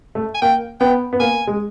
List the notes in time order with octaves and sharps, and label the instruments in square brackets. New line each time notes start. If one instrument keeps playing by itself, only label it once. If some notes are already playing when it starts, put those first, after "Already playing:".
[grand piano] A3
[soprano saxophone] G#5
[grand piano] A#3 [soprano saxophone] G5
[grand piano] B3 [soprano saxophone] G5
[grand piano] B3
[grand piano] A#3 [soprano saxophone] G#5
[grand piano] G#3